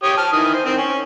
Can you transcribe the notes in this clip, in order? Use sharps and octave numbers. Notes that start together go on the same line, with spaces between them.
G4 C#5 D#6
A5 F6
D#3 E3 D#6
C5
D#3 C4
C#4